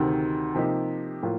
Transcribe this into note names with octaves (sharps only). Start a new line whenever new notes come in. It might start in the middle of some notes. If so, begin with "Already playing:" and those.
Already playing: D2 C3 D#3
C3 F3 A#3 D#4 G4
A2 F3 A#3 F4